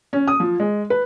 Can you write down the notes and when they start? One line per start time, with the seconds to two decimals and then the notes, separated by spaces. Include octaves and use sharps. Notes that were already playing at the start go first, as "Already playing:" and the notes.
0.13 C#4
0.28 D#6
0.40 F3
0.60 G#3
0.90 B4